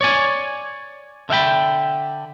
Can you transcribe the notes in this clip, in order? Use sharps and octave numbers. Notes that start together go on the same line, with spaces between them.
C#5 D5 G#5
D3 E5 F5 G5 B5